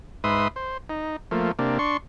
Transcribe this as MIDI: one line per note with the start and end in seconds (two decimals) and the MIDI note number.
0.24 0.48 44
0.24 0.48 71
0.24 0.48 76
0.24 0.48 84
0.24 0.48 87
0.56 0.77 72
0.89 1.16 63
1.31 1.52 53
1.31 1.52 57
1.31 1.52 58
1.59 1.78 48
1.59 1.78 58
1.59 1.78 62
1.79 1.97 62
1.79 1.97 84
1.79 1.97 85